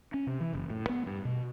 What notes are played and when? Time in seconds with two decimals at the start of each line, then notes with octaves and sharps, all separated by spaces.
0.14 C#4
0.27 C3
0.41 E3
0.53 F#1
0.70 A2
0.89 B3
1.07 G2
1.25 B2